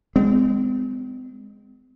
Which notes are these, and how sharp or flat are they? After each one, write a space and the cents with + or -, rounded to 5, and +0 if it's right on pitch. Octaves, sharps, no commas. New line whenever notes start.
G#3 -10 C4 -45